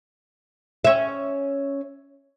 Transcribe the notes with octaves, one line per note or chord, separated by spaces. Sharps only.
C#4 E5